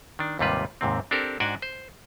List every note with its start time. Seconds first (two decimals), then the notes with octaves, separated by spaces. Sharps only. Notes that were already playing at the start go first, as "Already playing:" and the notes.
0.19 D#3 D4
0.39 D#2 G#2 C3 G3 F4 B4
0.81 D#2 G#2 C3 C4
1.11 C4 D4 G4 A4 A#4 C5
1.40 G#2 D4 F#4 D5 G5 G#5
1.62 C5